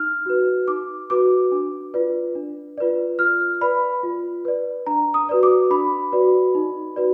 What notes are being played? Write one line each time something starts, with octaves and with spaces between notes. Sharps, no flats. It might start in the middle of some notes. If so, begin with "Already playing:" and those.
Already playing: D#4 F6
F#4 B4
D#4 D6
F#4 B4 D6
D4
F4 B4 D5
D4
F4 B4 D5
F4 F6
B4 D5 B5
F4
B4 D5
D4 A#5
D#6
F#4 B4 D5
D6
D4 B5
F#4 B4 D5
D#4
F#4 B4 D5